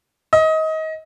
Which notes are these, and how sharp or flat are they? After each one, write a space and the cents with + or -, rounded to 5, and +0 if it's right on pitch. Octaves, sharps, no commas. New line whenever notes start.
D#5 +25